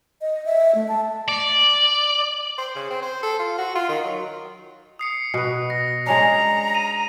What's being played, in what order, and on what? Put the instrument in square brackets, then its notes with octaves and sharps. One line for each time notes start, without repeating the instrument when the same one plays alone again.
[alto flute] D#5
E5
A3
A5
[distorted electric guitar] D5
[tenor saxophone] C5
C#3
C4
C5
A4
F4
F#4
F4
D#3
F#3
[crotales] D#6 C7 C#7
[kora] B2 B4
[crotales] A#6
[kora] G#3 C#4 D4 [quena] A#5
[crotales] D#7